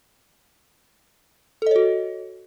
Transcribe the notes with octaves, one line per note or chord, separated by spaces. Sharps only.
F#4 A4 C#5 D#5